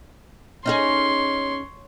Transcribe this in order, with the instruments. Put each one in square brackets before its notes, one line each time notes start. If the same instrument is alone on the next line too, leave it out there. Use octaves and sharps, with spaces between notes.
[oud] C#4 D#4 G#4 [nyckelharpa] C#5 C6